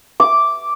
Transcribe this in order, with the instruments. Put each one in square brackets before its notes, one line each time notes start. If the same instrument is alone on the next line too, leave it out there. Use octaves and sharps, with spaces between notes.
[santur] D6